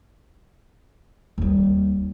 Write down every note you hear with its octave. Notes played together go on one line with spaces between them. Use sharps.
D#2 G3